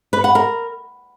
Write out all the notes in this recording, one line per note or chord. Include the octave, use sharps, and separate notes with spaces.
B4
F#5
A#4